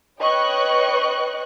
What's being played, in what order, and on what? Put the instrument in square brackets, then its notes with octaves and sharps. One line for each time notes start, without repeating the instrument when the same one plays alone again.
[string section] B4 C#5 D#5 G5 C#6 F#6